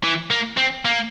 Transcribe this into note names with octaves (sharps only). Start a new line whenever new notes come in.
E3
A#3
C4
A#3